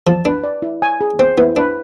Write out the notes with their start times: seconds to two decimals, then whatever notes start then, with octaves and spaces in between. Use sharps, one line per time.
0.07 F3 A5
0.25 D4 B4
0.44 D5
0.62 E4
0.82 G#5
1.01 G#4
1.19 C4 C5
1.38 B3 E4
1.56 D4 B4